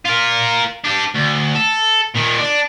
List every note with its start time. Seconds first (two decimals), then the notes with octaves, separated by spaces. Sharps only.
0.05 F4 A#4
0.85 D4 G4
1.15 D2
1.55 A4
2.15 A#2 D#3
2.39 D4